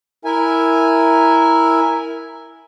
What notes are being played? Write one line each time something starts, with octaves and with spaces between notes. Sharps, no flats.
E4 A#4 E5 G#5